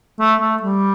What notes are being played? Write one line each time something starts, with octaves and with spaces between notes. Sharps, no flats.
A3
A3
G3